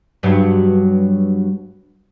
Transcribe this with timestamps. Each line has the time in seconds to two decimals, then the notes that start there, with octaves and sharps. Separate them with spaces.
0.23 G2 B2 F#3